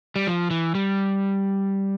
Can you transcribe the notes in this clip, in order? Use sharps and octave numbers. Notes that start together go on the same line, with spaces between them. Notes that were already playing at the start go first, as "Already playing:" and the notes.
G3
F3
E3
G3